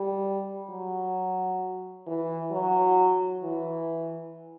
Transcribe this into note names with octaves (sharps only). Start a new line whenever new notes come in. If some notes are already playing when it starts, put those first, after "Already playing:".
Already playing: G3
F#3
E3
F#3
E3